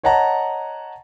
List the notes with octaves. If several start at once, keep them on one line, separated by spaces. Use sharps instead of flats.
C#5 D#5 F#5 A5 A#5